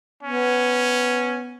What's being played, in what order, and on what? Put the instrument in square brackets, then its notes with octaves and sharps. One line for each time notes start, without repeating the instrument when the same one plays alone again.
[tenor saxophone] B3 [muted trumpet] C#4